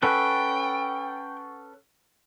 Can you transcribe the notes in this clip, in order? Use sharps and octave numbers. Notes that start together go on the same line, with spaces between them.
C#4 A4 B4 F#5 G5 C#6